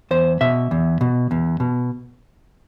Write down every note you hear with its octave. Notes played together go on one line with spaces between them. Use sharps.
E2 C5
B2 E5
E2
B2
E2
B2